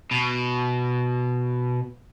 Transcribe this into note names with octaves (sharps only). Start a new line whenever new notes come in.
B2